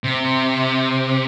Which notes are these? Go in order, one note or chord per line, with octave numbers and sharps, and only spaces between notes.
C3